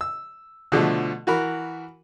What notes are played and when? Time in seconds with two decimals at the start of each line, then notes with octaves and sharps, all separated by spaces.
0.01 E6
0.72 B2 D3 F3 A3
1.27 E3 F#4 A#4 B5